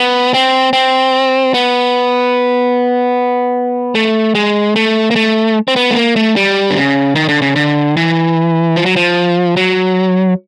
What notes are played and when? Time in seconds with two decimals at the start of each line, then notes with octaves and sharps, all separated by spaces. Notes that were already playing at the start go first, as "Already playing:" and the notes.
Already playing: B3
0.34 C4
0.73 C4
1.54 B3
3.95 A3
4.35 G#3
4.76 A3
5.11 A#3
5.16 A3
5.68 C4
5.76 B3
5.91 A3
5.96 A#3
6.16 A3
6.36 G3
6.71 D3
6.77 C#3
7.15 D#3
7.29 D3
7.42 C#3
7.56 D3
7.97 E3
8.76 F3
8.86 F#3
8.96 F3
9.57 F#3